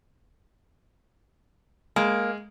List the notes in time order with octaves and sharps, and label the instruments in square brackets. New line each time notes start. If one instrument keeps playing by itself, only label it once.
[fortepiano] G#3 [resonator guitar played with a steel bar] A#3